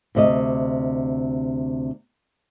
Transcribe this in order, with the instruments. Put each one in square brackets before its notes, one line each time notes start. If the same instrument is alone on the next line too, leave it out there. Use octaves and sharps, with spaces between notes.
[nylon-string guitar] D2 C3 D#5